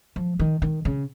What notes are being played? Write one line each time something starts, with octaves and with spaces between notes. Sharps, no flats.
F3
D#3
D#3
C#3